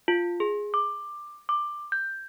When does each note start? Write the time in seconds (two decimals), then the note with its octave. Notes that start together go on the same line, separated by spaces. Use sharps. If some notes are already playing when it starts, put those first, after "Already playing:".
0.08 F4
0.40 G#4
0.74 D6
1.49 D6
1.92 G6